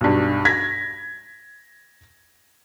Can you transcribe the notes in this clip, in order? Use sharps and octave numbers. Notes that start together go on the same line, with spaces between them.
B1 G2
G#6 A#6 B6